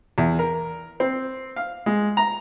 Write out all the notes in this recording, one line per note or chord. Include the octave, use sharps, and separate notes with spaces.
E2
A#4
C4
F5
G#3
A#5